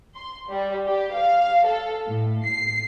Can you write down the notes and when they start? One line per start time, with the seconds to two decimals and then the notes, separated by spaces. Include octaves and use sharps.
0.15 C6
0.48 G3
0.87 G4
1.15 F5
1.65 A4
2.06 A2
2.45 C7